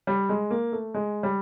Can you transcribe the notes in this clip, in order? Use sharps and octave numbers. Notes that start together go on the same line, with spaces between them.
G3
G#3
A#3
A3
G#3
G3